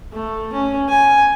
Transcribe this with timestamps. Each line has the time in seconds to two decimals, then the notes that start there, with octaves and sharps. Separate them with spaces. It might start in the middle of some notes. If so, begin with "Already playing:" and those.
0.12 A3
0.52 C#4
0.89 G#5